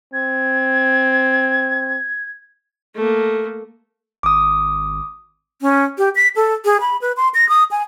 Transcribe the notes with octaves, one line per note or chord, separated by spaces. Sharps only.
C4 G#6
A3 A#3
G#1 D6 D#6
C#4
G4
B6
A4
G#4
B5
B4
C6
A#6
D#6
G#5